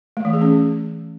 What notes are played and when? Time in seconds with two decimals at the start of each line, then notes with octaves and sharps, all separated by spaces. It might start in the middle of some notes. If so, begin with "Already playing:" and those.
0.17 A3
0.25 E3
0.33 G#4
0.41 C#4